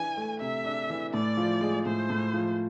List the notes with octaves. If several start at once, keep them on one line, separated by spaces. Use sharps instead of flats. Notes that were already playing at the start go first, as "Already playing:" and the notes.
Already playing: E3 D4 G#5
A3
C3 E5
D4
E3
A2 D5
F3
G#3
A2 C5
A2
F3